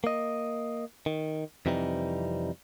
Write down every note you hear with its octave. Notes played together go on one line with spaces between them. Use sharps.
A#3 D#5
D#3
F2 C3 E3 G3 D#4